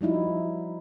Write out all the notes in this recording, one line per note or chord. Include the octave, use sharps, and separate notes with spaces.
F3 G3 D#4 E4 F#4